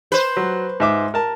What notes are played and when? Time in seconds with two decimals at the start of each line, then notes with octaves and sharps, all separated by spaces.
0.12 B4 C5
0.37 F#3
0.80 G#2 E5 D6
1.14 A#4 A5